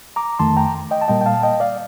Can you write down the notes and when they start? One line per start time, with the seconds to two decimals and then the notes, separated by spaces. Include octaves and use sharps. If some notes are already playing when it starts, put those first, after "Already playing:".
0.16 A#5 D6
0.39 F2 D#3 A3 A5 C6
0.57 G5 A#5
0.91 D#5 G5
1.02 A5
1.08 A#2 G3 A#3 D#5 G5
1.21 G5
1.26 F5 A5
1.43 D#5 G5
1.60 D5 F5